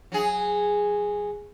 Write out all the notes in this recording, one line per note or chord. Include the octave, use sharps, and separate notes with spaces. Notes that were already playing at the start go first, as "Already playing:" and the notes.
F#3 G#4